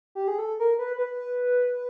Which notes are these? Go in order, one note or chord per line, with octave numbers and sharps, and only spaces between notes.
G4
G#4
A4
A#4
B4
B4